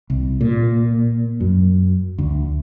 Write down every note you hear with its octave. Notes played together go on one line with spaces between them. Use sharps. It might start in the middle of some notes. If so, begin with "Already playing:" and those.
C2
A#2
F#2
D2